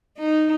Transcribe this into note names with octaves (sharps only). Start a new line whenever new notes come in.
D#4